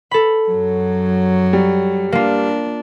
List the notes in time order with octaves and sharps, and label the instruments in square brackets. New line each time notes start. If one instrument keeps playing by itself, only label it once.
[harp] A4 B5
[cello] F#2 F#3
[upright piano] G3
[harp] A#3 F4 [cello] D4